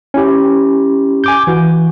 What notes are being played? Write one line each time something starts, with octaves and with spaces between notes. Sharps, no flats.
C#4 E4 G4
G#5 D6 G6
E3 F#4